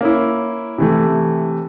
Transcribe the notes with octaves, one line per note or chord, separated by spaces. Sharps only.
A#3 C#4 E4
C3 E3 A3